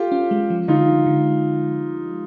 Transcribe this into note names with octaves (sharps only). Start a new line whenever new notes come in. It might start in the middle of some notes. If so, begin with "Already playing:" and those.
Already playing: F4 G4 A4
C#4
G#3
F3
D3 D#4 F4
D3
D3